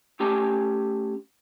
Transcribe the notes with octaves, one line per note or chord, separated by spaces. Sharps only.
A3 C#4 G4 G#5 A5